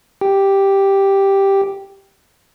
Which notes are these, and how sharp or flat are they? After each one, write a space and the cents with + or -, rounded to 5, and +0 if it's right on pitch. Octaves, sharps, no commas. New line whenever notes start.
G4 +0 G5 +0